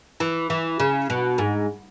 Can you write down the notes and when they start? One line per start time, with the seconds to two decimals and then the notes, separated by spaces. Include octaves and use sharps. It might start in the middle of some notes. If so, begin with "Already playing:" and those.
0.20 E3
0.50 E3
0.80 C#3
1.10 B2
1.38 G#2